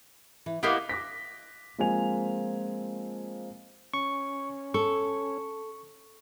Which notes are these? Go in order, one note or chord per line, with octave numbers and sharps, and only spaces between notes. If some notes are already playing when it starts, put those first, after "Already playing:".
E3
A#3 B3 E4 G4 D#5 F5
D6 F#6 A#6 B6
F3 G#3 A#3 C4 G#5 F7
C#4 C#6
A4 C#6